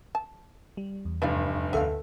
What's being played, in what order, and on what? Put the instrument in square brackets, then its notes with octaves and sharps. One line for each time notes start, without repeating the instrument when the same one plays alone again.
[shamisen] A5
[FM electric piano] G3
E2
[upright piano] F1 G2 [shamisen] B4 D5 F5
[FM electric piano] D2 A4 E5 [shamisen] B3 C5 F5